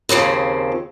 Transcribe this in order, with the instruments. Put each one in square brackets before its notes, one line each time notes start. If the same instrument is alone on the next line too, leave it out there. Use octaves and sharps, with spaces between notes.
[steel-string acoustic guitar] D#2 C#3 F3 C4